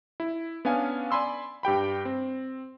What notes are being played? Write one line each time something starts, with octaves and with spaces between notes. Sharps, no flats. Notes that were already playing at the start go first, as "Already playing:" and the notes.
E4
B3 C#4 D4 F5 G#5
D5 G#5 B5 C6 E6
G2 G4 G5 B5
C4